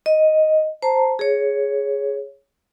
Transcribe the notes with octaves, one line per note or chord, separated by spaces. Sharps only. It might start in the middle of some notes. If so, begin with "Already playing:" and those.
D#5
C5 A5 A#5
G#4 C#5